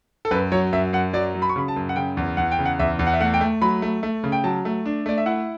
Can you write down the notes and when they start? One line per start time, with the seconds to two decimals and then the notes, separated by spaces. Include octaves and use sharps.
0.25 A4
0.31 F#2 B4
0.52 F#3 C#5
0.72 F#2 E5
0.93 F#2 F#5
1.13 F#3 D5
1.35 F#3
1.42 B5
1.49 C#6
1.56 C#3 B5
1.68 A5
1.76 F#2
1.89 F#5
1.96 C#3 G5
2.17 E2
2.37 E2 F#5
2.51 G5
2.59 C#3
2.66 F#5
2.79 E2 E5
2.99 E2
3.07 F#5
3.14 E5
3.20 A3 F#5
3.34 G5
3.41 A3
3.62 F#3 B5
3.82 A3
4.03 A3
4.24 C#3
4.32 G5
4.44 F#3 A5
4.65 A3
4.85 D4
5.06 A3 D5
5.18 E5
5.26 E4 F#5